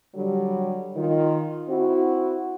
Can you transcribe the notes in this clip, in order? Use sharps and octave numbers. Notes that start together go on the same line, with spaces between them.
D3 F#3 G3
D#3 F4
C4 E4 F#4